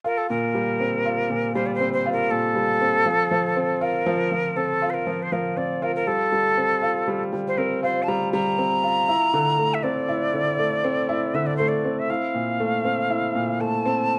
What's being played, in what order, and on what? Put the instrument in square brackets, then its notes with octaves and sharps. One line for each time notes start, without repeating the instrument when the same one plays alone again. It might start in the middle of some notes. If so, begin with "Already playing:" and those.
[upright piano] F4 [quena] A#4
[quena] A4
[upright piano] A#2 [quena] A#4
[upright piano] G3
C4
F4
A#2
[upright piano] G3 [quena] C5
[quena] D5
C5
[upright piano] C4
[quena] C5
[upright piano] F4
[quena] A#4
[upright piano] A#2 [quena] A4
[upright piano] G3
C4
F3
F3
C4
[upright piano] F4 [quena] A#4
[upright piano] F3
F3
[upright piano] C4 [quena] A4
[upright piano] F4
[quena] C5
A#4
[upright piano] F3
[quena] C5
[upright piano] F3 [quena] A#4
[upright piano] C4 [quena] D5
[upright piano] F4 [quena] A#4
[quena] A#4
[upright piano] G3 [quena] A4
[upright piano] G3
C4
F4
G3
G3
[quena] C5
[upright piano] C4 [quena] A#4
[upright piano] F4 [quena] C5
[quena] A5
[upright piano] G3 [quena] A#5
[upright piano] G3 [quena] A#5
[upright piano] C4
F4
E4
D3
A3
[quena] E5
[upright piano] C4 [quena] D5
[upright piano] E4
D3
A3
C4
E4
[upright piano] D3 [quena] E5
[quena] D5
[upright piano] A3 [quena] C5
[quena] D5
[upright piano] C4
[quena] E5
[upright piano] E4 [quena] F5
[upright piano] A#2
A3
C4
E4
A#2
[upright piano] A3 [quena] A5
[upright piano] C4